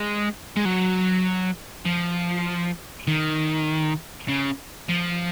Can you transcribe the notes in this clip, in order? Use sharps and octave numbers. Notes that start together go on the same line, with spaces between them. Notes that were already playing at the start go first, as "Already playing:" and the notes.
Already playing: G#3
G#3
F#3
F3
D#3
C#3
F3